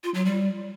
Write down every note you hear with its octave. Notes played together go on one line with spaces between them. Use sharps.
F4
F#3
G3